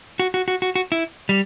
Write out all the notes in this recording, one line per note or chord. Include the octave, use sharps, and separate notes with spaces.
F#4
F#4
F#4
F#4
F#4
E4
G3